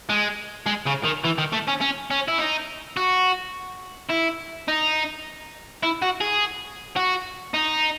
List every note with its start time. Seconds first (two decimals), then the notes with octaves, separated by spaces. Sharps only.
0.10 G#3
0.66 G#3
0.87 C#3
1.05 D#3
1.25 E3
1.38 D#3
1.52 A3
1.68 C#4
1.81 C#4
2.10 C#4
2.28 E4
2.38 D#4
2.97 F#4
4.10 E4
4.68 D#4
5.83 E4
6.02 F#4
6.21 G#4
6.96 F#4
7.54 D#4